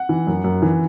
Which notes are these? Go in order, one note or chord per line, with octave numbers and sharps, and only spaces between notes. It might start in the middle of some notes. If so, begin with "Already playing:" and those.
Already playing: F#5
E3
F#2
F#2
E3